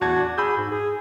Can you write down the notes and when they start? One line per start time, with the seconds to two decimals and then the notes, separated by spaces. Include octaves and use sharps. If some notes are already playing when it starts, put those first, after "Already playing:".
0.01 E2 F#4 A5 G#6
0.16 D4
0.38 G#4 B5 E6 G6
0.57 G#2
0.72 G#4